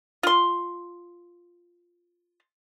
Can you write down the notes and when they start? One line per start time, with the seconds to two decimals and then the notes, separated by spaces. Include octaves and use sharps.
0.23 F4 C6